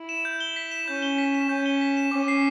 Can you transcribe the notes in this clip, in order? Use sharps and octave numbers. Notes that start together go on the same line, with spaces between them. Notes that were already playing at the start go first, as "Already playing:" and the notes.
Already playing: E4
E7
G6
G7
B6
E7
C#4 G6
G7
B6
E7
C#4 G6
G7
B6
E7
C#4 D6
C7